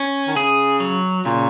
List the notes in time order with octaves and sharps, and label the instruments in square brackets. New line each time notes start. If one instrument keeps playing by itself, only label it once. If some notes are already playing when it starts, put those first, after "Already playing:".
Already playing: [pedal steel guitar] C#4
[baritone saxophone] D#3
[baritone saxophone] C#3 [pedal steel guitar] G#4
[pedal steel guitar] F#3
[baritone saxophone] A#2 [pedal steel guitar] C#3